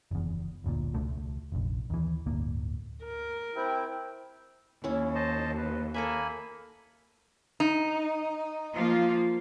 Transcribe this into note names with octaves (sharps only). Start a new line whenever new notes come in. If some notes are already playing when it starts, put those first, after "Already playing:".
F#1 E2
F#1 D2 A#2
E1 C#2 A3
F1 A#1
D#2 E3
D1 G1 D2 A#3
A#4
C3 E4 G5
D#2 C#4 E4
C5 D#5 A5
B4
A#3 A4 D#5 E5 G#5 B5
D#4
F3 A#3 F4